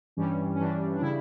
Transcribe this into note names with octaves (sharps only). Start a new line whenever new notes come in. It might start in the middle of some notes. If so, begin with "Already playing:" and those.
G2 E3 G3 C#4
C#4
G2 E3 G3 D4
D4
C#3 G3 E4